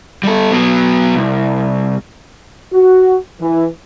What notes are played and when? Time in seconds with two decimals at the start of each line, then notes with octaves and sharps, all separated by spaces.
0.23 G3 A4
0.51 F#3 B3
1.16 C2
2.73 F#4
3.41 E3